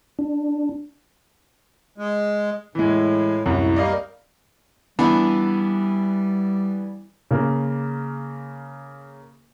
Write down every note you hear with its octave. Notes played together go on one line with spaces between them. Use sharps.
D4
G#3
A2 E3 G#3
C2 F#2 A2
G3 A#3 D5 D#5 F5
E3 G3 B3 D4
C#3 A#3